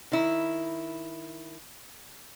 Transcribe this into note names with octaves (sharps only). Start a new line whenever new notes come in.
D#3 E4